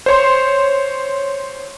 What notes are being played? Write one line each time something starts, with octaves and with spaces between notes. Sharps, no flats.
C5 C#5 C6